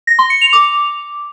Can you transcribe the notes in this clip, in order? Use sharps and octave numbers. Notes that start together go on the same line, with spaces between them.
A#6
C6
C#7
F7
D6